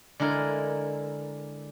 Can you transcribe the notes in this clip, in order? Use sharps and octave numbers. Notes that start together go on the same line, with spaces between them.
D3 G#3 E4 A#4